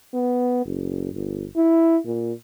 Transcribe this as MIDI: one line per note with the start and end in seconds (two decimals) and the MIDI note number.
0.14 0.63 59
0.66 1.11 30
1.13 1.45 31
1.56 1.97 64
2.05 2.32 46